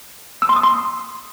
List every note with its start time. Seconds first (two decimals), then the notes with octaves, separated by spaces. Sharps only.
0.42 E6
0.49 C6
0.56 D#6
0.63 C6